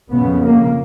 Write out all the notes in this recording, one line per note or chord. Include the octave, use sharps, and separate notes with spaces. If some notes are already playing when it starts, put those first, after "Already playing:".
F2 C#3 B3
A#3